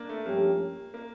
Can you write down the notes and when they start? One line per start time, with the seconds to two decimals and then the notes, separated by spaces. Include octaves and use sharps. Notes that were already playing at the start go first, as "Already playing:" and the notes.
Already playing: A#3 D4
0.09 A3
0.26 G2 F3 A3 A#3 C#4 G4
0.94 A#3